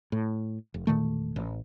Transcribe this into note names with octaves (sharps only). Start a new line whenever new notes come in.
A2
F1
E1 A#2 D#3 A3
A1